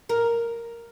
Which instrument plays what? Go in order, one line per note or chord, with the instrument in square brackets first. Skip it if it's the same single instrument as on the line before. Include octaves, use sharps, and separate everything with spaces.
[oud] A#4